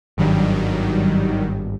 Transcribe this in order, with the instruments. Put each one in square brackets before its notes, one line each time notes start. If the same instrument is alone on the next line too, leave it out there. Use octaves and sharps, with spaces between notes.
[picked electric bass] G#1 G2 [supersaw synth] D#3 F#3 G3